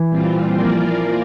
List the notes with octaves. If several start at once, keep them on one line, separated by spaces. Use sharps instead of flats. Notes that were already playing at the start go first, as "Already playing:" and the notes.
Already playing: E3 E4
A#2 G3 C4 F4
F3 A#3 F4 A#4 D5